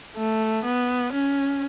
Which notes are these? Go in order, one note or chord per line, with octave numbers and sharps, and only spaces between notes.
A3
B3
C#4